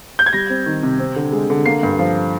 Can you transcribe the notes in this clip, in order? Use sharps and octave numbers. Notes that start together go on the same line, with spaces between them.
G6
G#6
G3 A#6
C4
D#3
C3
C4
D3
G#3
D3
A#3 C7
G2
F3